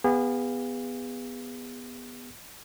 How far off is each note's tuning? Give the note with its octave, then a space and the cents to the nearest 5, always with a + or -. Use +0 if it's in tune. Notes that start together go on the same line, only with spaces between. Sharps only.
B3 +0 G#4 -35 F5 +0